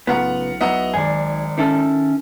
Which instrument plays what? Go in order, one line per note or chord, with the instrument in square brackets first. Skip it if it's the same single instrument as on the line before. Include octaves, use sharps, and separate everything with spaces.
[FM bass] B1 [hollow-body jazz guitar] A2 C#3 B3 [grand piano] F4 F#5 A#5
[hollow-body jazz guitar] F#3 B3 E4 [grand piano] D#5 F#5 A#5
[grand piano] G#1 D5 [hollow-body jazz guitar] G#4
[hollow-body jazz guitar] D#3 E4 A4 [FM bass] C#4